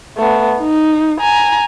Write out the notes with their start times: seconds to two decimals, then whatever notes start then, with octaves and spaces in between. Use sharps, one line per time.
0.17 A3 B3
0.61 D#4
1.21 G#5 A#5